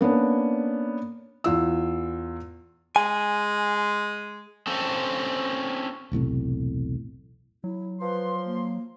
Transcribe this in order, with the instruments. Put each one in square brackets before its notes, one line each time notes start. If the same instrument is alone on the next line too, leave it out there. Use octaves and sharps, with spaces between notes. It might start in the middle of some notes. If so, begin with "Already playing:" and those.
[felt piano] A#3 B3 C#4 D4
E2 F4 E6
[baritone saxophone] G#3 [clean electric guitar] G#5
[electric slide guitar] C4 C#4 A4
[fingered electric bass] E1 B1 A2 C3
[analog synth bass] F#3 [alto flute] E4
[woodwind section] F3 C6 [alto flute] B4
[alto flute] A#3